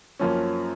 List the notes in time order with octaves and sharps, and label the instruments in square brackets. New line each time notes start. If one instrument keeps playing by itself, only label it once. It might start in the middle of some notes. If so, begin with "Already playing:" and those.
[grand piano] F#2 F3 A#3 C#4